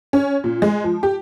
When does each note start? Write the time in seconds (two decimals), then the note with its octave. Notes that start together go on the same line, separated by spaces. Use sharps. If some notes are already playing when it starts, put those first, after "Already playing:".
0.13 C#4
0.44 A#2
0.62 G#3
0.84 F3
1.03 G4